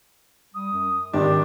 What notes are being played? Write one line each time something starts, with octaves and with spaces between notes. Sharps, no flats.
G3 D#6
F#2
G#1 D4 G4 D6